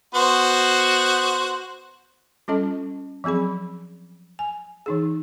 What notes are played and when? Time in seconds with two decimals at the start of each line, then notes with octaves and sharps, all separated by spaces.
0.15 B3 F#4 C5
2.48 G3 C#4 F4 A4 D#5 A5
3.24 F3 F#3 C4 G#4 B5
4.39 G#5
4.86 E3 D#4 G#4